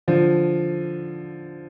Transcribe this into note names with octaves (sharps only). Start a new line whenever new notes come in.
D3 F3